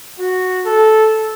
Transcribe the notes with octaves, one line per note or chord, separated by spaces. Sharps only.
F#4
A4